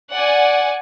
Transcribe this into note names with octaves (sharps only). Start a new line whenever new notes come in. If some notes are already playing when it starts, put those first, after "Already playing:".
D5 F#5 G#5